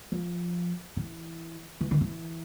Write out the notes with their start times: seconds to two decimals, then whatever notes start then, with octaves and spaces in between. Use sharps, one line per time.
0.12 F3
0.97 E3
1.81 E3
1.91 D#3
2.01 E3